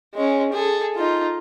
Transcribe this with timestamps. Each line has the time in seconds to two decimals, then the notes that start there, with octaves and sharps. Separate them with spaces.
0.14 G#3 C#4
0.53 G#4 A4
0.96 D#4 F4